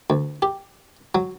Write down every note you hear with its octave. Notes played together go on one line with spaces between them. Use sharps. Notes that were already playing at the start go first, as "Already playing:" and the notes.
D2
G4
F#3